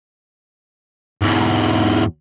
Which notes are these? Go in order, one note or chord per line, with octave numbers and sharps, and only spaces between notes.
E2 G#2